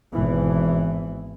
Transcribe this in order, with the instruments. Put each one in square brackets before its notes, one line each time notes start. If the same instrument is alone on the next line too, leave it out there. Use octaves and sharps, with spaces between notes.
[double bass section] G#1 B2 E3